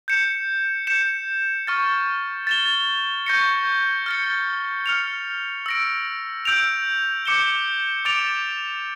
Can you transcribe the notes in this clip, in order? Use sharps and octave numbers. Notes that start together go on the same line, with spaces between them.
G6 C#7 E7
G6 C#7 E7
C#6 F6 A6
A6 E7 G7
C#6 G6 A#6 C#7
F6 A6 C#7
F6 C#7 F7
E6 A#6 D7
E6 G6 D7 F7
D6 G6 C#7 E7 G7
D6 A6 D7 F7